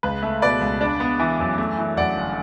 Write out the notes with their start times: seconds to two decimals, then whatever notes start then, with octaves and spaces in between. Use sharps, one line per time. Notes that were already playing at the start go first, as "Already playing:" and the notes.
0.03 C#2 B4
0.22 A3
0.42 B2 B4 D5
0.61 C#2
0.81 D4
1.00 B3
1.19 E3
1.39 F#2
1.58 A3
1.78 E3
1.97 F#2 D5 F#5
2.17 G1